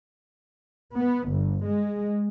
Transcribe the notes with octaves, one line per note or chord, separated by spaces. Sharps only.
B3
G1
G#3